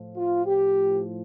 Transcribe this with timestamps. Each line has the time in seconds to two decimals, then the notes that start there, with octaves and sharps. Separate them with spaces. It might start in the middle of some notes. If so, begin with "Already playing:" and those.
Already playing: A2 F3
0.17 F4
0.46 G4